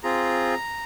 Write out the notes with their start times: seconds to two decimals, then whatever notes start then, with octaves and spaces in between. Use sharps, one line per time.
0.03 C4 F4 G#4 A#5